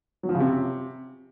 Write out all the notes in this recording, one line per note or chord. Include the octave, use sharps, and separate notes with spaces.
F#3
F3
C#3
C3